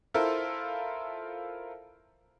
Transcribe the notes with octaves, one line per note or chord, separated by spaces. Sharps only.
E4 F4 A4 A#4 C5 E5